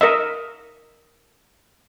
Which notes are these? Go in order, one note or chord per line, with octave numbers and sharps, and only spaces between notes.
A#4 D#5 E5